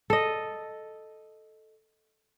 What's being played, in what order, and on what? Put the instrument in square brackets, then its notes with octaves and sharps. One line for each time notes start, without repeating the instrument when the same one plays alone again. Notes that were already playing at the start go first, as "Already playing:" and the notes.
[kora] A4 D#5